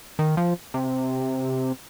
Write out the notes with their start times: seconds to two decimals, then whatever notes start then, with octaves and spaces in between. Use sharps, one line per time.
0.19 D#3
0.37 F3
0.74 C3